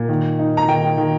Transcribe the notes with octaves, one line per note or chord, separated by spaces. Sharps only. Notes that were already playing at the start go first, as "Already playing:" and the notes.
Already playing: A#2
D#3
D#4
A#5
D#3 G5
D#3